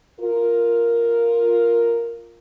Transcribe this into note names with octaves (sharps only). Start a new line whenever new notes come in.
F4 A#4